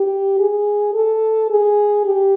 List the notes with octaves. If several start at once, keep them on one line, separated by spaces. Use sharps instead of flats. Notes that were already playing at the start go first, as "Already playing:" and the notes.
Already playing: G4
G#4
A4
G#4
G4